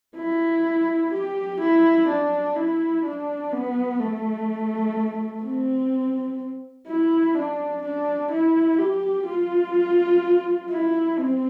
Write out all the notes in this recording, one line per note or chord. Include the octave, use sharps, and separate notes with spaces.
E4
G4
E4
D4
E4
D4
B3
A3
C4
E4
D4
D4
E4
G4
F4
E4
C4